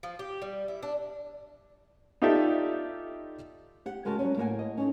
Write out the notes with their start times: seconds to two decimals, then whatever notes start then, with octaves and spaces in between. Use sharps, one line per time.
0.03 F3
0.19 G4
0.42 G3
0.68 E4
0.83 D4
2.22 D#4 F4 G4 A4 D5 E5
3.86 G4 F#5
4.05 C#3 G#3 F#4 A#4 C#5 A5
4.19 F#3 G3 A3 C#4
4.37 A2 A#3 A#4 E5 F#5 G#5
4.59 D#5
4.77 C#4 D#4 A4